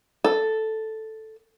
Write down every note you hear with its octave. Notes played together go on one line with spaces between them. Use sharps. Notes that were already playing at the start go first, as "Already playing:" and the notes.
A4